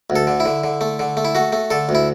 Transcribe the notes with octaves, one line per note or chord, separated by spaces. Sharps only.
D2
A4
D3
E4
D3
D3
A3
D3
A3
E4
A3 F#4
A3
D3 A4
D2
E4